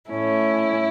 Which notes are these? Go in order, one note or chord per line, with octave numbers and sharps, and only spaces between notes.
A2 A3 C#4 E4